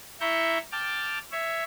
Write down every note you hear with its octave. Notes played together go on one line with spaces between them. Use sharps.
E4 E5 A#5 C#6 G6
G5 A5 D6 F6
C#5 E5